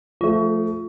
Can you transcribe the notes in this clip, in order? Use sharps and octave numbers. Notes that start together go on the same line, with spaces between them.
F3 A3 F4